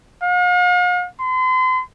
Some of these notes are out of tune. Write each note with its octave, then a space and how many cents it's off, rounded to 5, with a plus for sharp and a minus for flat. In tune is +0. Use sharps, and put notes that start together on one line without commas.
F5 +45
C6 -40